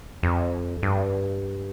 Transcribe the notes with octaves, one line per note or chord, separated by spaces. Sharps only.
F2
G2